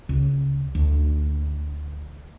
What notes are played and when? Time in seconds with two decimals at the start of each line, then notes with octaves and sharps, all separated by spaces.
0.09 C#2
0.75 D2